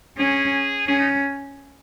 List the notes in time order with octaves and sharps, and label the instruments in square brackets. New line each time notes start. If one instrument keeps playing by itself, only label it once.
[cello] C#4 [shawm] G#4
[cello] C#4 [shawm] G#4
[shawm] D#4